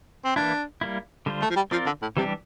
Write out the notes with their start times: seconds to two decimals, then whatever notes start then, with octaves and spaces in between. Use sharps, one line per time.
0.24 C4
0.36 E3 A#3 D4 E4
0.81 G3 A#3 E4
1.26 D3 G3 D4 F4 C5
1.42 A3
1.50 F3
1.56 G3
1.71 F3 C4 F4 A#4 D5
1.86 D3
2.02 A2
2.17 C3 E3 G3 D4 G4